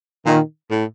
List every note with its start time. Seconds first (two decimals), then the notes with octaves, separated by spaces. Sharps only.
0.26 A#2 D#3
0.71 A2